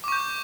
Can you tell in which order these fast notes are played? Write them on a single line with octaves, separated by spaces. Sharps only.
D6 C#6 G6